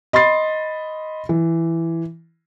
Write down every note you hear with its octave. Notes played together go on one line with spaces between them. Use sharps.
D#5 B5 C6 A6 C7
E3